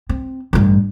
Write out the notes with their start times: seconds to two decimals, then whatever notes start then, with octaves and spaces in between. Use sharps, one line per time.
0.09 C4
0.53 A1 G2